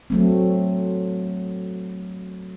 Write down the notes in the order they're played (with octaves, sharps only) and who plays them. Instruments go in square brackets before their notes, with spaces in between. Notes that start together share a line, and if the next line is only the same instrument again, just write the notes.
[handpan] F#3 A3 C4